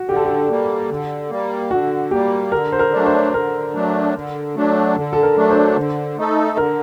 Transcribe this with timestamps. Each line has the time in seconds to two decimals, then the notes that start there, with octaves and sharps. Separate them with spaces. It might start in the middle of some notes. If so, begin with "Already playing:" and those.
Already playing: F#4
0.09 D3 G4
0.16 A4
0.25 G4
0.50 G3 A#3
0.90 D3
1.30 G3 A#3
1.71 D3 F#4
2.11 G3 A#3 G4
2.52 D3 A#4
2.72 C5
2.79 A#4
2.93 F#3 A3 D4
3.06 C5
3.33 D3 A#4
3.74 F#3 A3 D4
4.15 D3
4.55 F#3 A3 D4
4.96 D3 A4
5.13 A4
5.23 A#4
5.36 F#3 A3 D4
5.50 C5
5.77 D3
6.17 A3 D#4 A4
6.57 D3 A#4